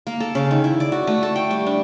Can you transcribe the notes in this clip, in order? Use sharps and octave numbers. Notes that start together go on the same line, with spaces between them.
A#3
A4
C#3
D#3
E4
D5
F#4
A3
A4
G5
G3
D4